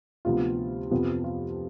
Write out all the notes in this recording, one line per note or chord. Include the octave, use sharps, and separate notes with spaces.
D2 C3 F3 B3 F4
F2 C3 F3 B3
F4